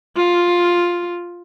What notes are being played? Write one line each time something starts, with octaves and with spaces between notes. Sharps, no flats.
F4